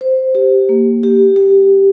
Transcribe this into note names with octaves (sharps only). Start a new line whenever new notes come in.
C5
G4
A#3
G4
G4